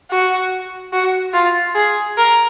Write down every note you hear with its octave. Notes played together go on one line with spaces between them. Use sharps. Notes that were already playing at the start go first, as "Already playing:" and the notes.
F#4
F#4
F4
G#4
A#4